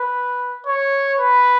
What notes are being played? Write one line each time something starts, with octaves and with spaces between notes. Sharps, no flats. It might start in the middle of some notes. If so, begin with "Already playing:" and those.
Already playing: B4
C#5
B4